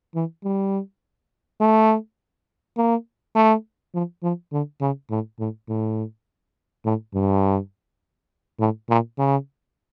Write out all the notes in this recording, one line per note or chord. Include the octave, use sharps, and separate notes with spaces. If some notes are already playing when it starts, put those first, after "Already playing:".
E3
G3
A3
A#3
A3
F3
F3
D3
C#3
A2
A2
A2
A2
G2
A2
A#2
C#3